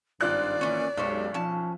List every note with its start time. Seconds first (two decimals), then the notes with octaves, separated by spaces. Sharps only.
0.21 G#1 G2 D#3 F4 D5 F#6
0.61 E3 A#3 C#4
0.97 B1 F#2 G#3 G4 C5 C#5
1.34 F3 C#4 A5